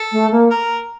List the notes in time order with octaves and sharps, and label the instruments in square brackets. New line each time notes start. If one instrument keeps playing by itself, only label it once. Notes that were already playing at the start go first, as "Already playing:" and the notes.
Already playing: [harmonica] A4
[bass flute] A3
A#3
[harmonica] A#4